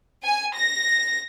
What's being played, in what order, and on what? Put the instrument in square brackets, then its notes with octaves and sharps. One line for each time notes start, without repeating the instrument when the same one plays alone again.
[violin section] G#5
A#6